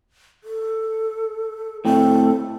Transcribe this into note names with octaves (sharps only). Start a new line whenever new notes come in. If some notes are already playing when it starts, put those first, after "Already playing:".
A4
A2 C4 A4